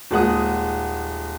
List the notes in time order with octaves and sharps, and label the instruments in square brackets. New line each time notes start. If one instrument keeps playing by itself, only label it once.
[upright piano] D#1 G#3 F#5 D#6